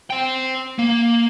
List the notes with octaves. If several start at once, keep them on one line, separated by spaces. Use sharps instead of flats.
C5 G5
A#3